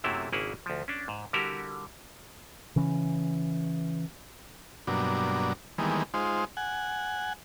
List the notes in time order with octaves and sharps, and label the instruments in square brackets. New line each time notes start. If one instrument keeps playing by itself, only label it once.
[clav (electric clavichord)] F#2 C3 F#3 A3 A#3 E4
G#1 C#3 A#3 E4 G#4 F#5
D2 F3
C#4 D4
G#2
D3 G3 E4 F#4 G4 A#4
[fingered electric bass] C#3 E3 C#4
[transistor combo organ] G2 B2 F#3 A#3 D4
D#3 E3 G3 G#3 A#3 B3
G#3 D#4 F4 C5
F#5 G#5